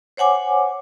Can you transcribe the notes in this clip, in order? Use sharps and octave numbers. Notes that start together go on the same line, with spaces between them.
C5 C#5 F#5 G#5 D6